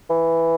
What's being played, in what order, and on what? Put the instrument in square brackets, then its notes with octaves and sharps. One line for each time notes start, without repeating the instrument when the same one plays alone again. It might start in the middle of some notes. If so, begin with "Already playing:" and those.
[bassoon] E3